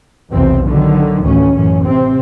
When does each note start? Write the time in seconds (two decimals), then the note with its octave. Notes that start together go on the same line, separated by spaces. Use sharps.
0.30 B1 E2 C3 C4
0.68 D3 D#3 F#3
1.23 A1 D2 C#4
1.54 A1 F#2 C#4
1.84 C3 C4